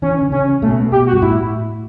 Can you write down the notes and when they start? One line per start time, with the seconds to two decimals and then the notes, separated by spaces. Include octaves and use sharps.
0.02 E3 C#4
0.21 D3
0.32 C#3 C#4
0.62 B2 A3
0.92 B2 G4
1.07 F#4
1.13 G2
1.22 A2 E4